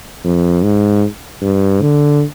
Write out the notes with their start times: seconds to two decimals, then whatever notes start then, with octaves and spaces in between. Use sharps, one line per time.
0.25 F2
0.63 G#2
1.42 G2
1.81 D3